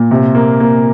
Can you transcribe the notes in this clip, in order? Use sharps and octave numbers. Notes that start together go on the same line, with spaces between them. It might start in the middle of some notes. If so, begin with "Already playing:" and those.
Already playing: A#2
C3
A#3
A#3